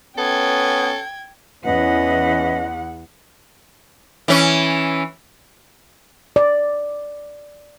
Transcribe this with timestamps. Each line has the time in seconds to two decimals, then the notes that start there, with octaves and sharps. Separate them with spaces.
0.18 B3 C#4 A4 G5 G#6
1.65 E2 E3 C#4 B4 D#5 F#5
4.28 E3 C#4
6.36 D5